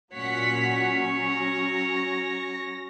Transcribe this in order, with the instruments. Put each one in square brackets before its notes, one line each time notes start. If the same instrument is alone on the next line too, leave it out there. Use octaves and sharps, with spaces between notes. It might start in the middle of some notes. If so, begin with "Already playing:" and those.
[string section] A#2 F#5 B6 [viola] F#3 C#4 [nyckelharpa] C#5
[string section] A#6